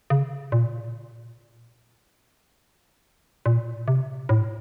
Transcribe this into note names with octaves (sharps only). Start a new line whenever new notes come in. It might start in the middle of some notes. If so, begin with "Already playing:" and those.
C#3
A#2
A#2
C3
A2